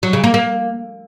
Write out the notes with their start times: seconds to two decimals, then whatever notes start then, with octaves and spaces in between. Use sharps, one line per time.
0.03 F#3
0.13 C#3
0.24 A#3
0.34 A#3